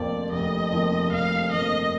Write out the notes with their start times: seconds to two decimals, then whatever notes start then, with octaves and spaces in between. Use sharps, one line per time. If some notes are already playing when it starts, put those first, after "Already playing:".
Already playing: F1 F2 F3 A#3 D5
0.32 F1 D#5
0.72 F2 F3 A#3
1.12 F1 F5
1.52 F2 F3 A#3 D#5